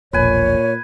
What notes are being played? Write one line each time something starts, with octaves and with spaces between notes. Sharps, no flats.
E1 A#1 A#2 B4 C#5 G#5